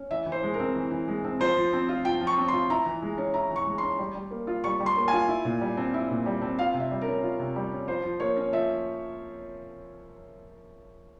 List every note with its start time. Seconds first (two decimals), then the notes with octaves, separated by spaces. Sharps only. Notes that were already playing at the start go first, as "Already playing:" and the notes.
Already playing: C#4
0.11 E3 E5
0.26 E3
0.32 C5
0.43 G#3
0.54 A#4
0.59 C4
0.75 E3
0.91 E3
1.08 G#3
1.24 C4
1.40 F3 C5
1.57 F3
1.73 C4
1.89 F4
2.04 F3 G5
2.21 F3
2.27 C#6
2.38 C4
2.48 C6
2.53 F4
2.70 E4 A#5
2.86 E3
3.02 G#3
3.18 C#4
3.34 E4 A#5
3.51 E3
3.56 C#6
3.66 G#3
3.78 C#4 C6
3.99 G3
4.15 G3
4.31 A#3
4.47 F4
4.64 G3 C#6
4.80 G3
4.86 C6
4.97 A#3
5.08 G#5
5.13 F4
5.28 E4
5.45 A#2
5.61 G3
5.77 C4
5.94 E4
6.10 A#2
6.26 G3
6.42 C4
6.58 F4 F5
6.74 C3
6.80 E5
6.91 G3
7.01 A#4
7.07 C#4
7.23 F4
7.39 C3
7.56 G3
7.72 C#4
7.88 F3 C5
8.03 F3
8.20 A#3 C#5
8.37 C#4
8.53 F3 E5